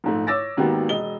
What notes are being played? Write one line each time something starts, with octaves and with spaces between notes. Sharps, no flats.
A#1 G#2 A3
C#5 D6 E6 A6 A#6
G#1 D#3 A#3 B3 F#4 G4
E1 D#5 G7